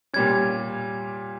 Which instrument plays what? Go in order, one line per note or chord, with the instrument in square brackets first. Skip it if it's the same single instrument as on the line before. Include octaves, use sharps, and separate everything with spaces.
[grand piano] A#2 G3 C#4 [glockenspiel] G#6